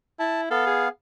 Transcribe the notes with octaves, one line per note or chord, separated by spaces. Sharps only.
E4 A5
B3 A4 F5
G#4